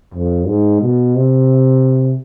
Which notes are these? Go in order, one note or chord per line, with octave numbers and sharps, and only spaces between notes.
F2
G#2
B2
C3